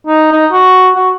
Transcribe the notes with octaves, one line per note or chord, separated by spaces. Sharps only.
D#4
D#4
F#4
F#4